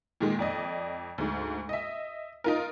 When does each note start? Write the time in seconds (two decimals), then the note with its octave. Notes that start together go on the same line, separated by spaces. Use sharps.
0.21 A#2 D#3 G#3
0.39 F2 D5 D#5
1.18 D2 G#2
1.69 D#5 E5
2.44 D#4 F4 A#4